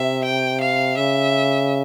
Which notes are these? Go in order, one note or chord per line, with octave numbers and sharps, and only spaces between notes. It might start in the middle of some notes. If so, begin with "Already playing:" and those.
Already playing: C3 E5
G5
F5
C#3 E5